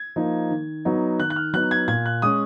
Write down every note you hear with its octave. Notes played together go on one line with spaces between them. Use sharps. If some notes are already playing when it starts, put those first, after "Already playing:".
Already playing: G#6
F3 A#3 D#4
D#3
F#3 B3 D#4
D#3 F#6
F#6
F6
F#3 B3 D#4 F#6
G#6
A#2 G#6
F#6
G#3 C#4 D#6